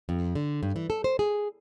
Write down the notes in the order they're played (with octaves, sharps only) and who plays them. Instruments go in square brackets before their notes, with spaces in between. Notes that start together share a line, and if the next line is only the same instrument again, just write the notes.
[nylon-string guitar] F2
D3
G2
E3
A4
C5
G#4